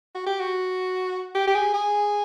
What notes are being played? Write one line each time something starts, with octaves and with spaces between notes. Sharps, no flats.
F#4
G4
F#4
G4
G4
G#4
G#4